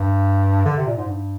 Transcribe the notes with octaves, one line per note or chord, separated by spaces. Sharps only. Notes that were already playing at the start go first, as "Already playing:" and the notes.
Already playing: G2
D3
C3
A#2
G#2
G2